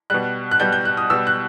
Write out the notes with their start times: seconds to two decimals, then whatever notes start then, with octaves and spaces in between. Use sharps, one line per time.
0.10 B2 G3 F#6
0.51 F#6
0.60 B2 G3 G6
0.73 G6
0.85 F#6
0.97 D#6
1.10 B2 G3 E6
1.27 F#6